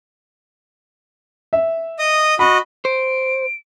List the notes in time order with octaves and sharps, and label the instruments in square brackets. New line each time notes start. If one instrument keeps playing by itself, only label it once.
[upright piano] E5
[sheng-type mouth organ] D#5 D#6
[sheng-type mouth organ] F#4 D#5 [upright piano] B5
[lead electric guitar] C5 [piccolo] D7